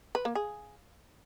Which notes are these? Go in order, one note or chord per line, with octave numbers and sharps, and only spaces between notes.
B4
A#3
G#4